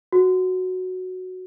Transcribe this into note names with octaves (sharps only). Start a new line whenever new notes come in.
F#4